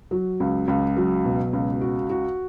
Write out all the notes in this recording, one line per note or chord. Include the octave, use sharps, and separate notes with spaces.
F#3
C#2
C#2
F#3
B2
C#2
F#4
F#4